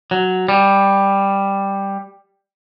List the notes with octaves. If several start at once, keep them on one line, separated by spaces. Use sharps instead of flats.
F#3
G3